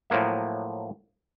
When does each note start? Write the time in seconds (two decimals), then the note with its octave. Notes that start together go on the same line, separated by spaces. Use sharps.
0.10 A2 F3 F#3 A#3 E5